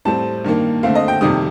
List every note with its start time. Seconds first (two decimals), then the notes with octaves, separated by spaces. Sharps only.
0.05 A2 G3 C4 A5
0.45 G2 D#3 A#3
0.83 D3 A3 C4 F5
0.95 D#5
1.08 G5
1.21 F2 C3 D#3 G3 D#6